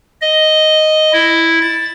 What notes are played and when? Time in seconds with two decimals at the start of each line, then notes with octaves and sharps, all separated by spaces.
0.21 D#5
1.13 E4
1.62 A6